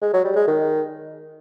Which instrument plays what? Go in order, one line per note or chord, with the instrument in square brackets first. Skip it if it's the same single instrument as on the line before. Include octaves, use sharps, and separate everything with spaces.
[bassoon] G#3
F#3
G3
G#3
D#3